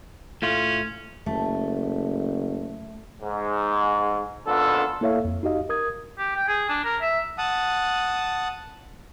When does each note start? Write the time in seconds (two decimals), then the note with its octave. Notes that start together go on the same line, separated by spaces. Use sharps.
0.42 A2 A3 C#4 F4
1.26 F#1 A3
3.23 G#2
4.47 G#1 B3 D4 F4 A4
5.01 A#3 E4 A4 C#5 E5 F5
5.25 F2
5.43 D#4 F#4 G4 D#5 F5
5.69 A#4 D#6 G#6
6.18 G4
6.36 G5
6.48 G#4
6.69 D4
6.84 A#4
7.01 E5
7.38 F#5 A5 D#6